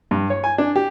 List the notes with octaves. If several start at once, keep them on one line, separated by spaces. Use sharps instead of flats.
G2
C#5
G#5
D4
G4